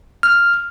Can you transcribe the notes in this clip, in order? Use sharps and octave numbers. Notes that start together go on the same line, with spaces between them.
F6